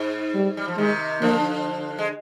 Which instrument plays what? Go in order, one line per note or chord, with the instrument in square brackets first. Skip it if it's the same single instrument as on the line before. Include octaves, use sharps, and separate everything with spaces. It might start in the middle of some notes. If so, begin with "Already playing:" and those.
Already playing: [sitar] G#2
[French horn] G3
[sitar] G3
F3
[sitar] C3 D#3 [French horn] G#3
[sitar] D3 F3 [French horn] A#3
[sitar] G#3